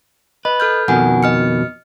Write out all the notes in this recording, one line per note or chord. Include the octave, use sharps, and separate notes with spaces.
B4 D#5
A4 F6 G6
F2 B2 D#3 F#5 G#5
D#5 F6 C#7